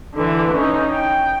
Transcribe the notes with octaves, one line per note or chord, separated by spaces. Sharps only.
D3 E3
C#4 D#4
G5